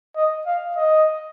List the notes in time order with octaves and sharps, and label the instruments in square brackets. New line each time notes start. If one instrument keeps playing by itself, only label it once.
[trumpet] D#5
F5
D#5